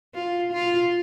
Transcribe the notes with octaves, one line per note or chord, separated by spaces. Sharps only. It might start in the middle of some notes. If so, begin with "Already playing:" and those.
F4
F4